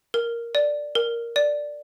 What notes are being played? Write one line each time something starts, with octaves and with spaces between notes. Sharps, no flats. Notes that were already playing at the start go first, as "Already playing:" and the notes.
A#4
D5
A#4
D5